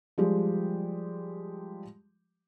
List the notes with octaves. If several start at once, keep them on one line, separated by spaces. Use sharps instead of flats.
F3 G3 G#3 G4